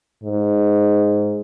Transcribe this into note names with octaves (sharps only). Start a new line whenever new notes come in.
G#2